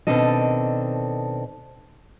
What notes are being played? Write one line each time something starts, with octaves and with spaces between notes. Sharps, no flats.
B2 D#3 C4 D4 A4 D#5